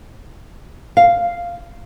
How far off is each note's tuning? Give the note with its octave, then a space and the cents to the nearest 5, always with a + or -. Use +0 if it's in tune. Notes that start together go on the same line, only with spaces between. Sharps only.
F5 -5